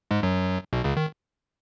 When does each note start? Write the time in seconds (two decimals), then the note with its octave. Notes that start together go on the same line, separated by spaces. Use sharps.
0.11 G#2 G#3
0.23 F#2 F#3
0.73 B1 B2
0.84 C#2 C#3
0.97 D#3